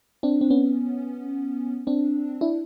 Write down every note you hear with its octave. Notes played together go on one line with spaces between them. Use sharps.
C4 D4
C4
B3 C#4
C4 D4
D4 E4